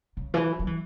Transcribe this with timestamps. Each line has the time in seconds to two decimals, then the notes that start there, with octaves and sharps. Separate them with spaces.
0.17 C#3
0.34 E3
0.59 F#3
0.67 E3